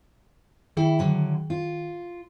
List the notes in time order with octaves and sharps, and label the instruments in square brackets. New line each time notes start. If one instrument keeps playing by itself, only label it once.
[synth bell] D#3 G#4 G5 [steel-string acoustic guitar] E4
[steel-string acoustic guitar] D3 F#3
F4